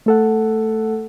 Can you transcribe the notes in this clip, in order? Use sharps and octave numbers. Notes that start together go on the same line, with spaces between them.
A3 A4 F#5